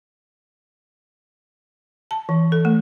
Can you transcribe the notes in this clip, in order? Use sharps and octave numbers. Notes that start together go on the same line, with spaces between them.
A5
E3
A4
A3